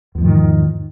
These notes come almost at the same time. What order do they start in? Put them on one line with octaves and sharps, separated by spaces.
E2 F3 G#2 D#3